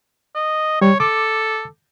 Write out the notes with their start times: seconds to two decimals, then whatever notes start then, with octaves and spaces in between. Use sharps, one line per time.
0.35 D#5
0.81 G3 C#5
1.00 A4 D6